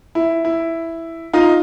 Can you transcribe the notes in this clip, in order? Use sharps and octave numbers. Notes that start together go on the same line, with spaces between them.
E4
E4
D#4 F4